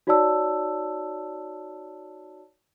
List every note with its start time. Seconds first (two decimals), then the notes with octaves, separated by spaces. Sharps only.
0.07 D#4 F#4 C#5 D5 A5 E6